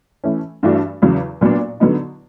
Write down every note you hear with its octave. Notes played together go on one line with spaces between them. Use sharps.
E3 A3 C#4
G2 E3 A3 D4 F#4
E2 C#3 F#3
A#2 F#3 B3 D4
D3 F#3 B3 D#4